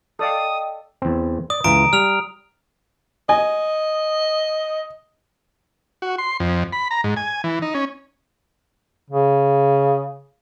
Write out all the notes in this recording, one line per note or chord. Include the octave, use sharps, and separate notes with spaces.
A4 D5 D#5 F5 G5 D#6
E2 C4
D5 D#6
C#2 E3 F4 A#5 D7
G3 F6 F7
D#5 G#5
F#4
C6
F2
B5
A#5
G#2
G#5
E3
D#4
C#4
C#3